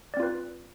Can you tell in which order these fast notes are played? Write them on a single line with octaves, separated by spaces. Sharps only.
D5 C4 F4 B4